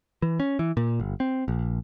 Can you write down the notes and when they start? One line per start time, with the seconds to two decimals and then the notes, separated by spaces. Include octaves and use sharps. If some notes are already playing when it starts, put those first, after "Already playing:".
0.22 E3
0.40 C#4
0.59 E3
0.77 A#2
1.00 G1
1.20 C4
1.48 A#1